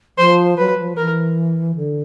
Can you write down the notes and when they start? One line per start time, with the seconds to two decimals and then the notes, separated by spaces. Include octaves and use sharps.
0.18 F3 C5
0.58 F#3 B4
0.78 F3
0.97 E3 A#4
1.75 D3